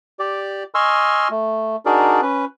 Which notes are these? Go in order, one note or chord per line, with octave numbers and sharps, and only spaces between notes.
G4 D5
D#5 G#5 C6 C#6 E6 F6
A3
D4 D#4 F#4 G#4 A#4 D5
C#4 B4